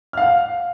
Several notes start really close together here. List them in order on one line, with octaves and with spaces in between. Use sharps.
F6 F5 F#5